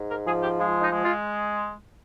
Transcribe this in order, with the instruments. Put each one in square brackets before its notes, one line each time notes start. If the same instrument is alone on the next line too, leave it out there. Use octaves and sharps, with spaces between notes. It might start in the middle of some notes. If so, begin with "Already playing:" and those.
Already playing: [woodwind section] G#2
A#4
F3 G#4
G4
G#3 F4
D#4
G#3
F4